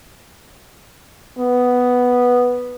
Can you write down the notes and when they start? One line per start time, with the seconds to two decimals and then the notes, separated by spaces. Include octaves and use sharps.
1.39 B3